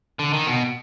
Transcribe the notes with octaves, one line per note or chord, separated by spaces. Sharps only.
D3
D#3
B2